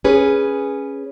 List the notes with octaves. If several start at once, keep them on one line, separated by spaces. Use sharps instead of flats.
C#4 G#4 B4